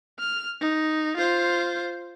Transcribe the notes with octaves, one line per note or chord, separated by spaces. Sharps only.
F6
D#4
F4 C5